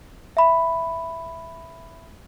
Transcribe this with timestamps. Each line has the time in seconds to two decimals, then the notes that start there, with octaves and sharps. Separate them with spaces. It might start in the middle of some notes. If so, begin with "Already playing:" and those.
0.37 E5 B5